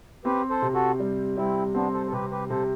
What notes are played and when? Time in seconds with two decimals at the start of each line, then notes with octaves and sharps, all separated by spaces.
0.25 C4 G4 B4
0.50 A4 C5
0.62 C3
0.74 F#4 A4
1.00 G3
1.37 G3 C4 E4
1.75 B3 C4 D4
1.93 A4 C5
2.06 A4
2.12 C3 G4 B4
2.31 G4 B4
2.50 C3 A4 C5